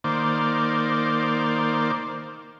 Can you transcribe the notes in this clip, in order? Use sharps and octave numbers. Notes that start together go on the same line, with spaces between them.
D#3 A#3 C5 D5